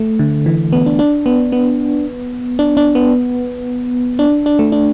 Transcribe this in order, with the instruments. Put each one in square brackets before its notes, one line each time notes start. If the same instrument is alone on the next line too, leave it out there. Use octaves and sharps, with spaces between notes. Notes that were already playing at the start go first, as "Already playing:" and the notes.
Already playing: [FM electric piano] A3
D3
E3
B3
D4
D4
B3
B3
D4
D4
B3
D4
D4
A3
D4